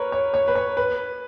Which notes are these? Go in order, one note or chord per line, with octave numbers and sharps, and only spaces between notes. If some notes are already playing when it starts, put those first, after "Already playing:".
Already playing: A#4 B4 C#5
C#5
C#5
B4
C#5
B4